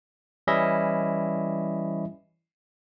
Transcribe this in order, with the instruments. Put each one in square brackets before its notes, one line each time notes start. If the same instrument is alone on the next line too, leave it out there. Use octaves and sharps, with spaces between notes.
[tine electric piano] E3 G3 C#4 E4 D#5 E5